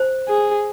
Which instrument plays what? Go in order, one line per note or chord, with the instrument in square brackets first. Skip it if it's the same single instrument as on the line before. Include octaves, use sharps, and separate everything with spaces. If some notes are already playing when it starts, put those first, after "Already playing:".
Already playing: [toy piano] C5
[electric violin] G#4